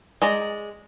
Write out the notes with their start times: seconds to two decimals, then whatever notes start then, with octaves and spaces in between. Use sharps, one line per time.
0.22 G#3 D5 A#5